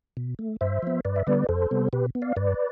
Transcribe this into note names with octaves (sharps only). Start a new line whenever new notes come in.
B2
A3
G2 C5 E5
F3 B3
G2 B4 D5
E5
D3 G3 B3 B4 D5
F2 A4 C5
C3 G3 B3
B2 G4 B4
B3
D5 F5
G2 B4 D5